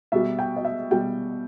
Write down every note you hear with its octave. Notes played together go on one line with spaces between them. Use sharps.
B2 G3 E5
G5
D#5
E5
B2 G3 G5